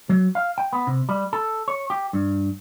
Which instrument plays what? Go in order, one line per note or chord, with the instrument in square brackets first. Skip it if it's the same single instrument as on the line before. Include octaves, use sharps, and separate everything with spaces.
[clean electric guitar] F#3
F5
G5
B3
C3
G3
A4
C#5
G4
G2